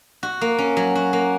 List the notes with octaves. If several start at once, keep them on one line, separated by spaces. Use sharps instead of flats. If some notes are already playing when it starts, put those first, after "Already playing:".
F#4
A#3
C#4
F#3
F#4
A#3